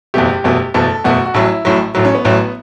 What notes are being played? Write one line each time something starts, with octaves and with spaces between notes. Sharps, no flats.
F#1 E2 B2 A3 G4
F#1 E2 B2 A3
F#1 E2 B2 A3 A4
F#1 E2 B2 A3 F#4
F#4
A1 A2 F#3 E4
A1 A2 F#3
A1 A2 F#3
C#4
B3
A1 A2 F#3